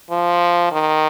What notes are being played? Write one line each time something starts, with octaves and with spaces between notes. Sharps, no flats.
F3
D#3